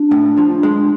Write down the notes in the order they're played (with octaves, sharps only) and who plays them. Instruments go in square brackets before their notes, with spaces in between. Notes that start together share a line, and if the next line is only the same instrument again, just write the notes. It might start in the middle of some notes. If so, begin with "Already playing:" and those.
Already playing: [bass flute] D4
[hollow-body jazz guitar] A2
F3
G#3